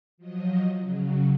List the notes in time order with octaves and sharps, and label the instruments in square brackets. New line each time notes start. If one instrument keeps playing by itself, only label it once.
[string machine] F3 F#3 D#5
C#3 F#3